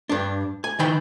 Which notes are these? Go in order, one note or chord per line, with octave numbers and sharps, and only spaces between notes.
G2 D4
G#5
D#3 E3 D#4 G5 B5